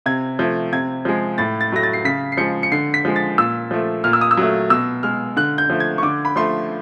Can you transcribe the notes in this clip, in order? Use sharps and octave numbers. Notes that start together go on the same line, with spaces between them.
C3 G#6
F3 A3
C3 G#6
F3 G#3
A2 A6
A6
F#3 A3 A#6
A6
C7
C#3 B6
C7
F3 G#3 C#7
C#7
D3 C7
B6
F3 G#3
A6
A#2 E6
F3 A3
A#2 F6
E6
D#6
E6
F#3 A3
B2 E6
G#3 F6
D3 F#6
G6
F3 A3
G#6
C#6
D3 D6
B5
F3 A3 C6